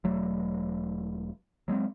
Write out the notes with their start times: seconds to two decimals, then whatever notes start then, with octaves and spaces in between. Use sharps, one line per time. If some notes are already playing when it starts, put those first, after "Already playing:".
0.04 E1 F#3 A3
1.68 F#3 G#3 A#3 C4